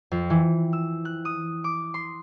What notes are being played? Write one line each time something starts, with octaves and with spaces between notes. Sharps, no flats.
F2
E3
E6
F#6
D#6
D6
C6